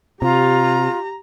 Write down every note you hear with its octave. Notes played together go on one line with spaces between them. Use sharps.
C3 F4 G4 A#5